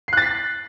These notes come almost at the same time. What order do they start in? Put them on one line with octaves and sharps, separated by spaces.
C7 F#6 A6 B6